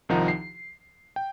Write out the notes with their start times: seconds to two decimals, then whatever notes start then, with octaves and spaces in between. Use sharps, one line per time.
0.09 C2 D#3 F3 D#4 F#5 A#5
0.28 C7
1.16 G5